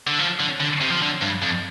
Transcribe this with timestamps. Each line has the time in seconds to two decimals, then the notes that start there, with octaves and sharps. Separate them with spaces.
0.07 D3
0.19 F3
0.40 D3
0.60 D3
0.81 C3
0.90 F3
1.02 D3
1.21 G2
1.42 F2